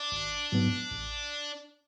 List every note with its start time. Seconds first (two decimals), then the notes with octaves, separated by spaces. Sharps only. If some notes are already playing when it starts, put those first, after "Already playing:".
Already playing: D4
0.12 G#1
0.52 G#2 F#3 B3
0.91 A1